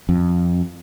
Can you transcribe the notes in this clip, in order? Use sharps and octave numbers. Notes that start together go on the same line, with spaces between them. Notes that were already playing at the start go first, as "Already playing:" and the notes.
F2